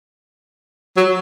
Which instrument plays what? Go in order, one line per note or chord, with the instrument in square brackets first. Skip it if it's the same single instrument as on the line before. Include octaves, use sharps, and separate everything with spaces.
[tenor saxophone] F#3